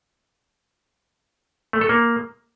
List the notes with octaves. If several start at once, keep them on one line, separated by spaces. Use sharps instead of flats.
A3
A4
A#3